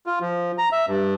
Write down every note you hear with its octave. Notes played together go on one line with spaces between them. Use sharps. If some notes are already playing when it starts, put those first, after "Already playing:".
F4
F3
A#5
E5
G2